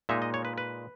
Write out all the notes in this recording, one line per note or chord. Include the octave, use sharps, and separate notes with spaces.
A#2 G#3 D#4 E5
D#5
C#5
B4
B4